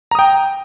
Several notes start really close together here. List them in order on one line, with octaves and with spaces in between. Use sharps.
A#5 D#6 G5